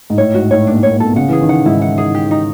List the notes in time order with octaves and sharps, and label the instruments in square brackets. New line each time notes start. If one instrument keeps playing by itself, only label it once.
[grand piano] G#2
[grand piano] A2 [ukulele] C#5
[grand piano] G#2 [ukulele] F#4
[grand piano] A2 [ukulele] C#5
[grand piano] A#2 [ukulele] D4
[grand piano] A2 [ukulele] C#5
[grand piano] A#2
[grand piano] B2 [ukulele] A4
[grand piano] C#3 [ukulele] F#5
[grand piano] E3 [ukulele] G#4
[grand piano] D#3
[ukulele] F#5
[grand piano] G#2 [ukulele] E4
[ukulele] F#5
G#4
G4
D#4